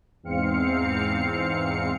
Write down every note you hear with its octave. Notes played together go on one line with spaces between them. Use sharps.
E2 G#2 C4 F5 C#7